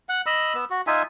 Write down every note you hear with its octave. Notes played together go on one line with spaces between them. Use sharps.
F#5
D#5 B5 E6
B3 E6
F#4
D#4 F4 E5 G#5